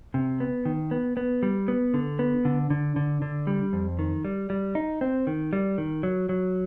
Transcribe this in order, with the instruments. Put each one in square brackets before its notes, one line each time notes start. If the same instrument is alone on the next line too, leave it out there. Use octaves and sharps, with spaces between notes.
[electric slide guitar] C3
B3
D#3
B3
B3
G3
B3
D3
B3
D3
D3
D3
D3
G3
F2
D#3
G3
G3
D#4
C4
D#3
G3
D#3
F#3
F#3